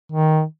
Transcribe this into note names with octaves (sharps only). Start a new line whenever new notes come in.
D#3